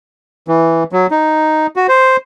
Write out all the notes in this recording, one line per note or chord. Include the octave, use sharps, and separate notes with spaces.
E3
F#3
D#4
F#4
C5